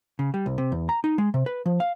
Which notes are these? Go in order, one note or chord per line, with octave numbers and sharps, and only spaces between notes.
C#3
G3
C2
C3
E2
A#5
D#4
G#3
C3
B4
F3
F5